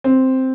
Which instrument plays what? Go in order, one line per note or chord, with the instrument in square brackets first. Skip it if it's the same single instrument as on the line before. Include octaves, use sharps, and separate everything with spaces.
[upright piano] C4